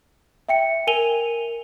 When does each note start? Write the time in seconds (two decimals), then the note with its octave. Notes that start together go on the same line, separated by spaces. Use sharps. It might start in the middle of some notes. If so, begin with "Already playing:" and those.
0.49 E5 G5 C#7
0.87 A#4 G#5 D#7 F7 G7